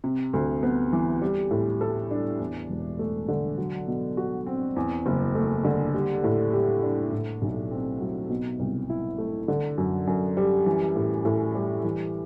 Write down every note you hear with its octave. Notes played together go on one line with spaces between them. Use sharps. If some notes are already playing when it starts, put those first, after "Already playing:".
C3
D2
B3
E3
G3
A2
A4
D4
E2
E1
A3
D3
F#3
B2
F#4
C4
E2
F#1
A3
D3
G3
A2
G4
D4
A2
B1
C4
F#3
B2
C2
E4
A3
D3
F#2
F#2
G3
E3
A2
A2
G3
E3